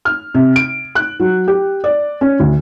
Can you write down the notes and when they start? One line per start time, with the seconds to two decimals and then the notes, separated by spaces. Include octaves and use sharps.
0.05 F6
0.34 C3
0.56 D7
0.95 F#6
1.20 F#3
1.48 G4
1.84 D5
2.21 C#4
2.40 D2